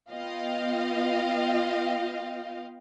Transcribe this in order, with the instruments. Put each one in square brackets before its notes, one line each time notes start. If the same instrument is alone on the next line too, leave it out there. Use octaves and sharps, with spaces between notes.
[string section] B3 F4 D#5 F5 G5